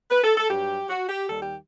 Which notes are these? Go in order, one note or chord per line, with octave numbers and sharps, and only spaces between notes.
B4
A4
A4
G2 F#3 G4
F#4
G4
D#2 D#3 G3 A4
G4